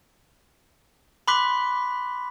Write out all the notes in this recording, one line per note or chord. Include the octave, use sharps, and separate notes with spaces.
B5 C6 D6 F#6 B6